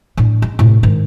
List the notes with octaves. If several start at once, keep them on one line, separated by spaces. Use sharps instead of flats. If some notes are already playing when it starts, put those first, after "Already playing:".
A2 D4
G#3
A2 C3
G#2 D#3